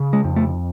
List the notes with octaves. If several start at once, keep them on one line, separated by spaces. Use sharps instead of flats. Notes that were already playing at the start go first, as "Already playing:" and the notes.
Already playing: C#3
G#3
F2
A3